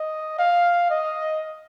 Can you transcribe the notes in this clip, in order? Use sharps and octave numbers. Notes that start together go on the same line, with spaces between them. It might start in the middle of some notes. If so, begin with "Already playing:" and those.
Already playing: D#5
F5
D#5